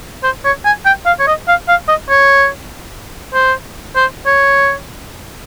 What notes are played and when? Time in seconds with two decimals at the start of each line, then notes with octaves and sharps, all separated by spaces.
0.24 C5
0.45 C#5
0.65 G#5
0.86 G5
1.06 F5
1.20 C#5
1.27 D#5
1.48 F5
1.69 F5
1.88 D#5
2.10 C#5
3.34 C5
3.96 C5
4.26 C#5